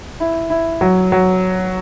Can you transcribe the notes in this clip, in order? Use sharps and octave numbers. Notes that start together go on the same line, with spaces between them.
E4
E4
F#3
F#3